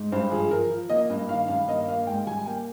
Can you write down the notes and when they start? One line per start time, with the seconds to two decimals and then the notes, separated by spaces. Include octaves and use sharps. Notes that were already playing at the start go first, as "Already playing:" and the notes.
Already playing: G#2
0.12 G2 C5
0.31 F3 G#4
0.51 F3 A#4
0.70 F3
0.89 A#3 D#5
1.10 G2
1.29 D#3 F5
1.48 G2 F5
1.68 A#3 D#5
1.88 A#3 F5
2.07 G#2 G5
2.27 G3 G#5
2.46 A#3 G5